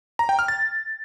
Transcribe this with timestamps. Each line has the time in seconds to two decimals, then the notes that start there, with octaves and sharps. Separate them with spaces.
0.19 A#5
0.29 G5
0.39 F6
0.48 A6